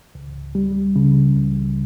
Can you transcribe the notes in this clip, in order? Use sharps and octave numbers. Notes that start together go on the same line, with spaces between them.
C#2
G3
C#3
C#2